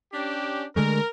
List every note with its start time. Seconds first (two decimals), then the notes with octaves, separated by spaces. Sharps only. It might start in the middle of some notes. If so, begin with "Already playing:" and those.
0.13 C#4 D4 G4
0.76 D3 G#3 A3 A#4